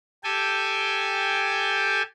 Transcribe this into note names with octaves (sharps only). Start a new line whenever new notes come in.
G4 A4 G5 G#5